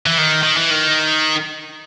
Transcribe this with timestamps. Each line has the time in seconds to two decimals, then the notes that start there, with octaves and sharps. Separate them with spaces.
0.06 E3
0.18 D#3
0.43 D#3
0.57 E3
0.71 D#3